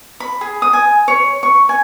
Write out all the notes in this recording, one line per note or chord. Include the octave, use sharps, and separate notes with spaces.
B5
G#4
D#6
G#5
C#5
C#6
G#5